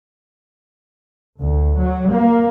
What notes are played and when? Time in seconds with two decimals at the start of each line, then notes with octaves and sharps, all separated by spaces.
1.40 D2
1.76 F#3
2.11 A#3